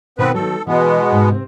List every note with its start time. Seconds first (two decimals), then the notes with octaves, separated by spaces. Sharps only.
0.19 B2 D#3 B3 C4 B4
0.34 D#3 F#3 A4
0.67 B2 E3 G#3 B3
1.12 G#2
1.31 C3 C4